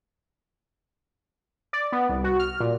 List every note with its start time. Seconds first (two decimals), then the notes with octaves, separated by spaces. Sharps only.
1.73 D5
1.92 B3
2.09 C2
2.24 F#4
2.39 F6
2.60 A#2